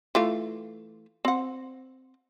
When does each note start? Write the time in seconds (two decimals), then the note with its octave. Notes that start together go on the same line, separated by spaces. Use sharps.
0.15 E3 A3 F4
1.25 C4 F#5